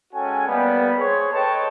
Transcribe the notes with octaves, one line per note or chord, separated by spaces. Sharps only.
G#3 C#4 F#4 A4 G5 G#5
G3 A#3 B3
G#4 C5 C#5
A4 B4 C#5 D#5 G5 A5